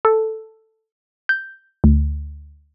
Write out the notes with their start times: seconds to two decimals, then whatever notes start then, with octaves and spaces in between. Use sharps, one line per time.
0.05 A4
1.29 G6
1.84 D2